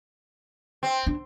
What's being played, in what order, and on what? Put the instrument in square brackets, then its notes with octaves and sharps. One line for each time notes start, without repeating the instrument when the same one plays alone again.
[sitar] C4
[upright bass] D4